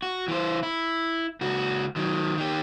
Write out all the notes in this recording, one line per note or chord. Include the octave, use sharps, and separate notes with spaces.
F#4
E3 C5
E4
C#2 F#4
D#3 F#3
D#3 G4